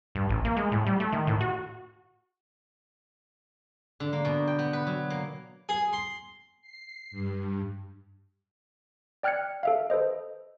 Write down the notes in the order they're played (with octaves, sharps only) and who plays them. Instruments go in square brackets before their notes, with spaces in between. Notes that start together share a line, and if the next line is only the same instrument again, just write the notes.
[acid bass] G2
A1
A#3
G#3
A2
G3
A3
D#3
A2
F#4
[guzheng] D3
A#3
B2
G5
B3
B4
F#3
A#3
[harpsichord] G#4
C6
[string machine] C7
G2
[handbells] D5 G5 F6 F#6 G#6 C#7
A4 E5 F5
A4 B4 C5 D#5